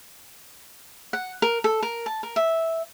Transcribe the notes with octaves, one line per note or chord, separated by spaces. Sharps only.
F#5
A#4
A4
A#4
A5
A#4
E5